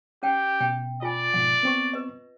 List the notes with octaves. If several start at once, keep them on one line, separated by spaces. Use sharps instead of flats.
C#4 G4 F#5 G5
B2 G5
F4 D5 G#5
G#2 B2 F3 F#5
B3 C4 C#6
B4 D#5